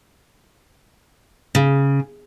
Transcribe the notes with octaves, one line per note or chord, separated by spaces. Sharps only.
C#3